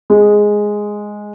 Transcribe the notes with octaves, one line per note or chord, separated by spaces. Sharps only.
G#3